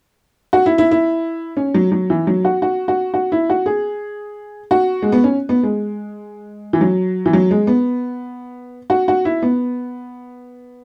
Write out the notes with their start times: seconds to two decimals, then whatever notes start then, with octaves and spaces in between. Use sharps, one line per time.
0.53 F#4
0.66 E4
0.78 E4
0.91 E4
1.57 C#4
1.74 F#3
1.92 F#3
2.10 E3
2.27 F#3
2.45 F#4
2.62 F#4
2.88 F#4
3.14 F#4
3.32 E4
3.50 F#4
3.66 G#4
4.71 F#4
5.02 G#3
5.12 B3
5.24 C#4
5.49 B3
5.63 G#3
6.73 E3
6.81 F#3
7.26 E3
7.33 F#3
7.51 G#3
7.67 B3
8.90 F#4
9.08 F#4
9.25 E4
9.42 B3